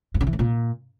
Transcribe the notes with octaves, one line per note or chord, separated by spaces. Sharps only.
G2
C#3
E3
A2
A#2